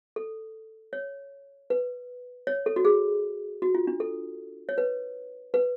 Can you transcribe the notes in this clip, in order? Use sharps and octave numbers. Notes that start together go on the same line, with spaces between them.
A4
C#5
B4
C#5
A4
F#4
G#4
F#4
F4
D4
A4
C#5
B4
B4